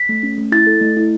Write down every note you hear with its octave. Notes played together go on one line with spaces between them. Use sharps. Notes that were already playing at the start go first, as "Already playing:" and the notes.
Already playing: B6
A3
C#4
A3
E4 A6
A4
A3
E4